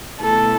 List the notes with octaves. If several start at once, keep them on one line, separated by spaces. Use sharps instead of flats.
B2 A3 E4 A4